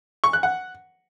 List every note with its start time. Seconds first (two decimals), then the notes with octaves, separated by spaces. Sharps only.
0.24 C#6
0.33 F#6
0.43 F#5